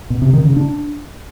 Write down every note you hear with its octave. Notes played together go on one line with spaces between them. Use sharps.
B2
C3
D#3
C#3
D4